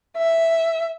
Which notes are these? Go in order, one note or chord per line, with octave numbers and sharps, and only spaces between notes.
E5